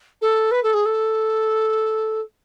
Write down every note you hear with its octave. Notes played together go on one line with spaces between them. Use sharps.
A4
B4
A4
G#4
A4